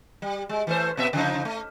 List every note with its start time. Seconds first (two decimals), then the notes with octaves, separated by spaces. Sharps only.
0.22 G3
0.49 G#3
0.67 E3 A3 C5
0.97 B2 B3 E5
1.13 C#3 F3 D#4
1.45 A3